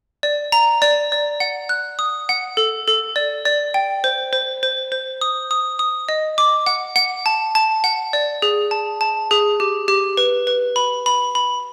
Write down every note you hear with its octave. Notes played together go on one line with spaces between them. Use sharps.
D5
A#5
D5
D5
F#5
F#6
D#6
F#5
A4
A4
D5
D5
G5
C5
C5
C5
C5
D#6
D#6
D#6
D#5
D6
F#5
F#5
A5
A5
F#5
D5
G#4
A5
A5
G#4
G4
G4
B4
B4
B5
B5
B5